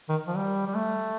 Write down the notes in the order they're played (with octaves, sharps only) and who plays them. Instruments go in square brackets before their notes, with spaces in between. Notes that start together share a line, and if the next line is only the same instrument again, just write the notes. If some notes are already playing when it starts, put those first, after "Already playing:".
[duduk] D#3
F3
G3
G3
A3